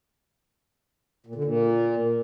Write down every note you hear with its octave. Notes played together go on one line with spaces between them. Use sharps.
A#2
D3
A#2